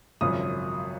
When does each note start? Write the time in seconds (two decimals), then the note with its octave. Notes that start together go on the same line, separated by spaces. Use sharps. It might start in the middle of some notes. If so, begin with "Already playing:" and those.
0.21 G#1 F#2 C#3 F3 D#6